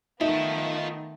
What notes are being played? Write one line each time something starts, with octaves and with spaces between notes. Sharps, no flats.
D#3 A3 B3 D#4 F4 E5 A5